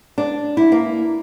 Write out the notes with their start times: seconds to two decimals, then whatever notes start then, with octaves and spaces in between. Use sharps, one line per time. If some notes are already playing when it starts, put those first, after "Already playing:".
0.18 D4
0.57 E4
0.72 A#3